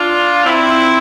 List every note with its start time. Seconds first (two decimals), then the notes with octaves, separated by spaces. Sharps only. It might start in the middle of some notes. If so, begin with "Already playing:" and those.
Already playing: D4 F4
0.44 C4 E4